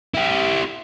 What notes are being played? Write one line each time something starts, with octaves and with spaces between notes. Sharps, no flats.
E4 G4